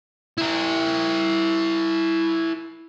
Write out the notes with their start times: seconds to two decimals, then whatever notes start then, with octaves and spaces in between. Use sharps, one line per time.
0.38 E4 A#4